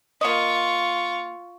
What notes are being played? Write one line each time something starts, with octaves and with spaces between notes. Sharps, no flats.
A#3 F4 D#5 C#6